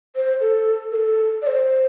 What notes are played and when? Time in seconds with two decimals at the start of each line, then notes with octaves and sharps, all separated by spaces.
0.16 C5
0.41 A4
0.92 A#4
0.96 A4
1.42 D5
1.47 C5